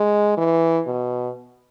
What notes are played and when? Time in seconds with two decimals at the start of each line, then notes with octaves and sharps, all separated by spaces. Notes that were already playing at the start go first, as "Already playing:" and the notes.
Already playing: G#3
0.38 E3
0.86 B2